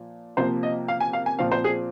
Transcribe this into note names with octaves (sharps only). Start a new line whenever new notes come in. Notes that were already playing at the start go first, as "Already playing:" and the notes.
Already playing: A#2 F3
C3 F3 A#3 C5
D#5
F5
G#5
F5
G#5
A#2 F3 C4 F5
C5
G#4